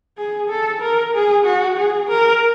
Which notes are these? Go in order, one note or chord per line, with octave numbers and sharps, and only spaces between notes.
G#4
A4
A#4
G#4
F#4
G#4
A#4